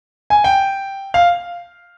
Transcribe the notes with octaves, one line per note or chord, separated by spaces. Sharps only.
G#5
G5
F5